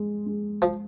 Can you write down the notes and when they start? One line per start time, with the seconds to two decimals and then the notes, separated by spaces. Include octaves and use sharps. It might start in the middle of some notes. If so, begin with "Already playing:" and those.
Already playing: G#3
0.26 G#3
0.62 F3